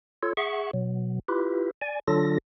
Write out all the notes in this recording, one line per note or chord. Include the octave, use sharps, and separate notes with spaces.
F4 A4 C#5
G#4 E5 F#5 C#6
B2 F#3
E4 F4 G4 B4
D5 G#5
D3 F#3 D4 F4 A4 A#6